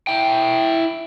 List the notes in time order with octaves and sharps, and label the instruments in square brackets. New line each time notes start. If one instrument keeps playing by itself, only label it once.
[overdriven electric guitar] E4 G5